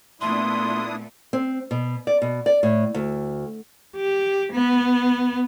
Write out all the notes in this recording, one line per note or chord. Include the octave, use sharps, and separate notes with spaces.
A#2 A3 B3 D4 E4 C6 D#6
C4
B2
D5
B2
D5
A2
D2
G4
B3